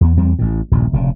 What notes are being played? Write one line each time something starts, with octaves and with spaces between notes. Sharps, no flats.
E2 B3
E2 G3 C4
A1 A2
D#1 A#1 G2
F1 A#2 C#3